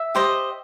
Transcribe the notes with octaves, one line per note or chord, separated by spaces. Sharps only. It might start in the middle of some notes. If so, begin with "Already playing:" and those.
Already playing: E5
G4 C5 D#5